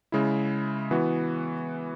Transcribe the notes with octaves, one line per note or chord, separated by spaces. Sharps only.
C#3 G#3 E4
E3 B3 F#4